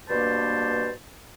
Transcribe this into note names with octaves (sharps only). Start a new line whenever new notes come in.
G2 B2 A#3 D4 C5 A5